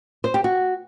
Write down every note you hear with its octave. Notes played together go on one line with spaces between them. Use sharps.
C5
G4
F#4